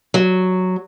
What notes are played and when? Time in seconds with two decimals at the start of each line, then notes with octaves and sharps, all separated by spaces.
0.14 F#3